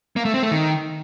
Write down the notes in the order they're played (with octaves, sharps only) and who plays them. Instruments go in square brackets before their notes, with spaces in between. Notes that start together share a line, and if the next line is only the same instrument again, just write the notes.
[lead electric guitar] A#3
A3
C4
A3
D#3